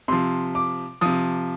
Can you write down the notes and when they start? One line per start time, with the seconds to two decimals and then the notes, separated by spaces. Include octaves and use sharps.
0.08 C3 F3 C6
0.55 D6
1.01 C3 F3 D#6